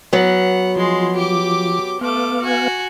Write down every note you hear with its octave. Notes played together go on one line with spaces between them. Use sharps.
F#3 B3 F#5
F3 G#3 C6
G4 D6
A3 B3 F5 D6
F#4 G#5